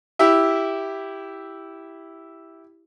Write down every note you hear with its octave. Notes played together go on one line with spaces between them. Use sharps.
E4 G4 E5